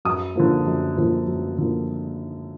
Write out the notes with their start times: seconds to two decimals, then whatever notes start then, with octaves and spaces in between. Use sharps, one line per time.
0.05 F#2 D#6
0.36 D3 F3 A#3
0.67 F#2
0.97 D3 F3 A#3
1.28 F#2
1.58 D3 F3 A#3